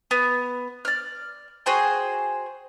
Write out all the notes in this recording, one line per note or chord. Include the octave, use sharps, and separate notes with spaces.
B3
D5 F6
F#4 G#4 C5 G5